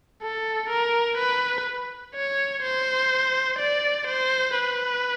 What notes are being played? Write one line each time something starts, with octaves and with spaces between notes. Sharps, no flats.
A4
A#4
B4
C#5
C5
D5
C5
B4